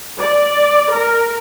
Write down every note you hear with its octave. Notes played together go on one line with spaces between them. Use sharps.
D5
A#4